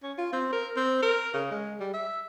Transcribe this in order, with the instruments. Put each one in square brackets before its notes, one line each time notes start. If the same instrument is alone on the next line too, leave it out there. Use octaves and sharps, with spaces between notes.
[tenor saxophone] C#4
F4
C4
A#4
C4
A#4
C#3
G#3
G3
E5